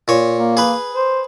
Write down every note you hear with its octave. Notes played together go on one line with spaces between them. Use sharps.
A#2 C#5
A#3
G#4 B4
C5